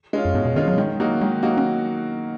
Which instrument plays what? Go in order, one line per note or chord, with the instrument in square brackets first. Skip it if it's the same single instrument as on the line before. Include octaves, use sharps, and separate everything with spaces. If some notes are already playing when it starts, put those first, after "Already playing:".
[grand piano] G#3 C#4 F4
[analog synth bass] F#2
[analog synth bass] G#2 [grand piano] B2
[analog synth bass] B2
[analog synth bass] D#3 [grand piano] G#3 C#4 F4
[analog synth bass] F#3
[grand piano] D#3 [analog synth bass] G#3
[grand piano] F#3 A#3 D#4 F#4
[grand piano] D#3 [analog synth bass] G#3
[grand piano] F#3 A#3 D#4 F#4
[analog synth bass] C#4